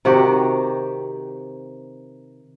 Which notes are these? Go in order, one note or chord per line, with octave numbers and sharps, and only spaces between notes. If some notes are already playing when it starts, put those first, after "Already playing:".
C3 D#3 F#4 G4